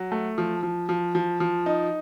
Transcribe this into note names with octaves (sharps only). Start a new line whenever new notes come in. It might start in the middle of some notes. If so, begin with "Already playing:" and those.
Already playing: F#3
A3
F3
F3
F3
F3
F3
D#4